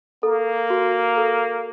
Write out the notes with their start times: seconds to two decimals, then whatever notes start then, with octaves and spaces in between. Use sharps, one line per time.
0.23 A#3 A4
0.70 F#4
1.17 A4